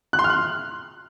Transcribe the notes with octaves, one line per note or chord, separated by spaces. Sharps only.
F#6
C6
F6
F#6